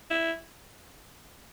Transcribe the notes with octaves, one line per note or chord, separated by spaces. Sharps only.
E4